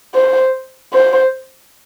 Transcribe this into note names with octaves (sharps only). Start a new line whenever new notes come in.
C5
C5